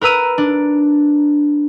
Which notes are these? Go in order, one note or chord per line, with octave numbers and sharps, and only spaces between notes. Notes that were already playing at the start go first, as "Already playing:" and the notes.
A#4 B4 A#5 E6 D#7
D4